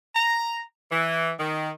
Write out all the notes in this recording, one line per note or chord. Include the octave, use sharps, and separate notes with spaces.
A#5
E3
D#3